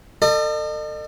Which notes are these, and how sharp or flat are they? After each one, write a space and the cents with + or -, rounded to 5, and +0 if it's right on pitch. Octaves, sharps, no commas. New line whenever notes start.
A4 +35 D#5 -40